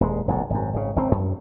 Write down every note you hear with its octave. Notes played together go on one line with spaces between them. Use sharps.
D#1 G#3
F1 B1 G#2
G#1 F#2
G#1 C#3
G#1 C#3 C4
F#2